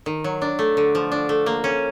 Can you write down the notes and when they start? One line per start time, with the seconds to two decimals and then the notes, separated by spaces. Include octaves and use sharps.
0.06 D#3
0.24 F#3
0.42 D4
0.59 A3
0.77 D3
0.95 F3
1.12 D4
1.29 A3
1.46 A#3
1.64 C#4